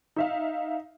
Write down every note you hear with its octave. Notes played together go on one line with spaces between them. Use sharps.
D#4 E5 F5